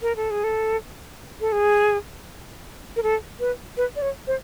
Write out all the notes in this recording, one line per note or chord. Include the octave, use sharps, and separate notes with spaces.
A#4
A4
G#4
A4
A4
G#4
A#4
A4
B4
B4
D5
C#5
C5